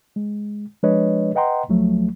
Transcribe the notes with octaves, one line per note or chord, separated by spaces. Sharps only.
G#3
F3 G#3 D4 B4 C#5 D#5
B4 D#5 F#5 G5 A#5 C6
C#2 F3 F#3 A3